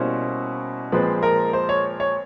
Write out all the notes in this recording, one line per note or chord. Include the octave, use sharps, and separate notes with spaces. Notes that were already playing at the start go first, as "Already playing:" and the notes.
Already playing: B2 G3 A#3 C#4 E4 C5
A#2 F3 G#3 C4 B4
A#4
C5
C#5
C#5